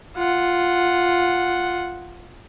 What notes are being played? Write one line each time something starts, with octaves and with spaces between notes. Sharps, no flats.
F4 F#5